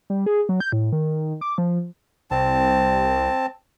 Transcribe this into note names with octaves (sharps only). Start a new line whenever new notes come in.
G3
G#4
F#3
G6
A2
D#3
D6
F3
C2 C4 A5